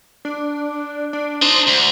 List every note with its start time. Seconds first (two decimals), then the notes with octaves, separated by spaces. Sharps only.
0.25 D4
1.13 D4
1.42 D#4 C5 A5
1.67 D2